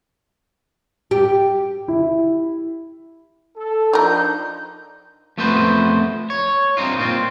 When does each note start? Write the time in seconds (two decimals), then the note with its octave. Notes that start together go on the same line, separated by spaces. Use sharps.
1.11 G4
1.88 E4
3.57 A4
3.93 F3 D4 D#4 F4 A#4 G6
5.38 F2 A3 B3 B4 C5
6.30 C#5
6.77 G2 C4 D#4 F4
6.98 A#2 C4 F4